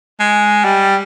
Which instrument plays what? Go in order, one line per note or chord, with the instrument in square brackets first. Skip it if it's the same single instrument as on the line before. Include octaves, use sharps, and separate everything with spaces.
[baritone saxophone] G#3
G3